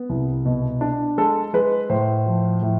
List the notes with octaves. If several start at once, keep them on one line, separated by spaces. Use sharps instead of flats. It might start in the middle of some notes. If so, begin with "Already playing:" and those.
Already playing: B3
C2
B2
D4
G#3 A4
G#3 B4
A2 C5
F3
A2